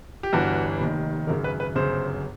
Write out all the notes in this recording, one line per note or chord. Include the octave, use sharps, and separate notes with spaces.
G4
G1 G2 E3 F#4
F1 D#2 D#3
G#1 F#2 C#3 A#4
B4
B4
G1 F#2 C#3 C5